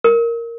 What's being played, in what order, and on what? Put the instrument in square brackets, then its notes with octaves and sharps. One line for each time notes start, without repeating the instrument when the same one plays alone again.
[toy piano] A#4